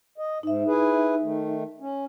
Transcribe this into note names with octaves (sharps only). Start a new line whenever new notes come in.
D#5
G#2 D#4 E5
E4 G#4 B4
D#3 A3
C#4